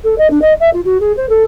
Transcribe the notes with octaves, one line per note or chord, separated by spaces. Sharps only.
A4
D#5
D4
D#5
E5
F4
F#4
G#4
C5
A4